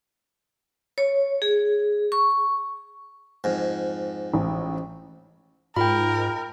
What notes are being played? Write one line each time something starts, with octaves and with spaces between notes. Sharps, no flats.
C#5
G#4
C#6
F2 G#2
A1
G#2 F4 A#4 G5 B5